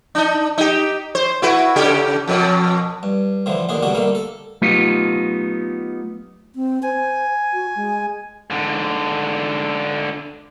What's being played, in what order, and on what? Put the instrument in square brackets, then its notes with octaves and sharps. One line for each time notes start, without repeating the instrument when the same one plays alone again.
[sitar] D4 D#4
D#4 G4
C5
E4 F#4 B4
C#3 G4
F2 B2
[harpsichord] G2
A2 D3 E3 F3
A1 D#2 D3 D4 G#4
G2 B2 D3 G3 D4 F#4
D3 G3 A3 A#3
A4
[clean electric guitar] F#3 A3 B3 D#4 F4 G4
[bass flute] C4
[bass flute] C5 [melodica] G#5
[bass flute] F#4
G#3
[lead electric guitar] G#2 D3